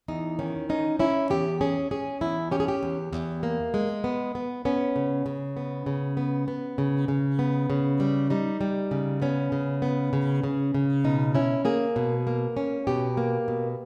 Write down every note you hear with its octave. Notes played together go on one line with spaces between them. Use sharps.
E2 D#4
D#3 C#4
C#4 D#4
C#4 E4
E2 G4
C#4 G#4
C#4 G#4
E2 E4
C#4 G4
G#4
G4
E2
E2
A#3
G#3
B3
B3
B3 C#4
C#3
C#3
B3
C#3
B3
B3
C#3
C#3
B3
C#3
G3
G3 D#4
G3
C#3
B3 C#4
C#3
B3
C#3
C#3
C#3
B2 D#4
C#4 E4
A#3 G#4
B2
A#3
C#4
B2 G4
A#3
B2